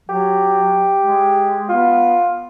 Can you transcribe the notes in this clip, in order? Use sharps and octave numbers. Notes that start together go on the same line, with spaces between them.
F#3 G4
G#3
B3 F4